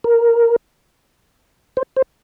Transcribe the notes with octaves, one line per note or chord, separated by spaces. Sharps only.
A#4
C5
C5